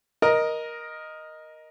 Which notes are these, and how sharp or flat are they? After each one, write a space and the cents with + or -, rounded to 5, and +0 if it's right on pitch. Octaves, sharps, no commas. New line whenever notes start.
A#4 +10 D#5 +0